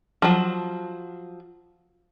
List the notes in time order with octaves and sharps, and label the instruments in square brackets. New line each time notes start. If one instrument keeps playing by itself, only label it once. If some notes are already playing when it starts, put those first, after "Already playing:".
[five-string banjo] F3 F#3